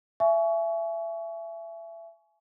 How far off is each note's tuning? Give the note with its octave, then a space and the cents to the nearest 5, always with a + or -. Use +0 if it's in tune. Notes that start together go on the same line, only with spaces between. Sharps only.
E5 +25 G#5 +25 C#6 +20